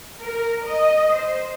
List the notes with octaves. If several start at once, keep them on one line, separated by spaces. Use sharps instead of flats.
A#4
D#5
C5